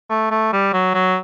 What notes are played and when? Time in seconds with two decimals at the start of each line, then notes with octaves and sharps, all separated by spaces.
0.10 A3
0.31 A3
0.53 G3
0.73 F#3
0.94 F#3